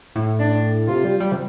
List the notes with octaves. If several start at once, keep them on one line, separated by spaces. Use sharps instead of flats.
A2
D4
C3 F4
G3
G3
C3